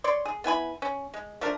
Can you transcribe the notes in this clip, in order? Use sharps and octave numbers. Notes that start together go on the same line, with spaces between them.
C#5 D5 C6
G#4
B3 E4 G#5 B5
C#4
G#3
F3 A3 D4 A#4